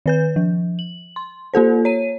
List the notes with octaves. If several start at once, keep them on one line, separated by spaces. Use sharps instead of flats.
D#3 B4 G6
F3
F#7
C6
A#3 F4 A4 C5
C#5 D#7